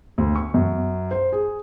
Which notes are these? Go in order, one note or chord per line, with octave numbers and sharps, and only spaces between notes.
D2
C#6
F#2
C5
G#4